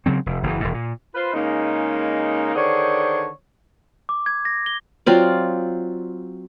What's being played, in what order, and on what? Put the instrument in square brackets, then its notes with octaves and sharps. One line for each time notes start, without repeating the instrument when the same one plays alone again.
[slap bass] C#3 F#3 C4
F1
F#1 E3
E1 G#2
A#2
[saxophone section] F4 B4 C5
C#3 G#3 A#3 D#4
D3 D#3 D4 G#4 C5 C#5
[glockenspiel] D6
G#6
A#6
G7
[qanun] F#3 C4 F4 D5